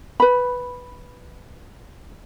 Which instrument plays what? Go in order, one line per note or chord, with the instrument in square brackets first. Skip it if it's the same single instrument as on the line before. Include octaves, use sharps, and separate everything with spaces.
[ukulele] B4 B5